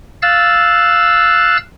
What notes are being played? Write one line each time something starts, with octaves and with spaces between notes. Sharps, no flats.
F5 E6 F#6 A6